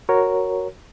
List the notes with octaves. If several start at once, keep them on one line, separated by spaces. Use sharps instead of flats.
F#4 A#4 C#5